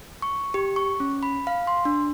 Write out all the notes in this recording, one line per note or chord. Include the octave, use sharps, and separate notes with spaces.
C#6
G4
C#6
C#4
B5
F5
C6
D4